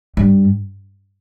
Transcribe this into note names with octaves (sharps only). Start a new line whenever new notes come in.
G2